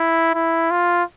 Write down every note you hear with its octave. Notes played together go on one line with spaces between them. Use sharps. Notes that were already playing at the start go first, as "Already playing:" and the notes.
Already playing: E4
E4
F4